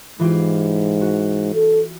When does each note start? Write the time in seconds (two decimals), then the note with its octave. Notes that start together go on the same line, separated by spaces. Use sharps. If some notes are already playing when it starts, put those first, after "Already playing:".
0.20 G#2 E3 F4 G4
1.01 F#4
1.54 A4